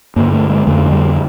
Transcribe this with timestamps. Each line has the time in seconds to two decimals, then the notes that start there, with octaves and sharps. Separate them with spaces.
0.16 G2 D3 A#3
0.33 A3
0.50 G#3
0.67 F2 D3 A3
0.92 G3